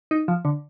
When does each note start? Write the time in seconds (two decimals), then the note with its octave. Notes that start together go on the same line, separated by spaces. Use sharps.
0.11 D#4
0.28 F3
0.45 D3